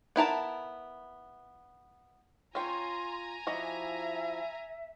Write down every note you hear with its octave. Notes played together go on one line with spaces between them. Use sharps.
B3 E4 A#4 A5
C#4 F4 C#5 G5 G#5 A#5 C6
F3 E4 F#4 G4 D#5 E5